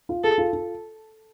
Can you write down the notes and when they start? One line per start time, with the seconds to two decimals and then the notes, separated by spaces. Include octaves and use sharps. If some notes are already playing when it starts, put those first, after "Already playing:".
0.09 F4
0.24 G#4 A4
0.38 F4
0.53 F4